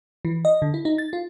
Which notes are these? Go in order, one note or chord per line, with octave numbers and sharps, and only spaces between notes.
E3
D#5
D3
E4
D#4
A6
F4